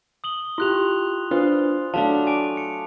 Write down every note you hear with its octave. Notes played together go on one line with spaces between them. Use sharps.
D#6 F#7 G7
E4 F4 G4 C6 F#6 F7
D4 F4 B4 C5
F#3 A3 D4 F5 A5 F7
G#5 D6 D7
C#7